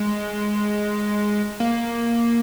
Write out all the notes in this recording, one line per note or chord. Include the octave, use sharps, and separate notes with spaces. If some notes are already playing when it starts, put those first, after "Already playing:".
Already playing: G#3
A#3